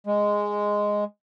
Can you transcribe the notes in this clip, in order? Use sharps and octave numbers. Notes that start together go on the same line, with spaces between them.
G#3